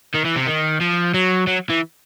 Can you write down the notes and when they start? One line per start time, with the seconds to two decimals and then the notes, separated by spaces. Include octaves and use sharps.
0.14 D#3
0.25 E3
0.36 C3
0.47 D#3
0.81 F3
1.14 F#3
1.47 F#3
1.69 E3